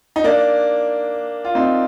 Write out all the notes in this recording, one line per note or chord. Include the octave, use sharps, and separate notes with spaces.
D#4
A#3 D4
F4
C4 D#4